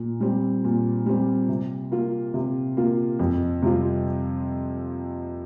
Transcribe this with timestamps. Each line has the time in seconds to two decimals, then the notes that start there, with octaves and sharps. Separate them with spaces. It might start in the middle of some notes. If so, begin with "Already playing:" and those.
Already playing: A#2
0.20 G3 C4
0.64 A#2
1.06 G3 C4
1.49 C3
1.92 A#3 F4
2.34 C3
2.77 A#3 F4
3.19 F2
3.62 C3 G3 C4 F4